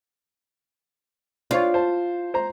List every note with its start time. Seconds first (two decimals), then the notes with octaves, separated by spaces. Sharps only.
1.51 D4 F4 C5 C#5
1.74 C5 A5
2.34 C5 A#5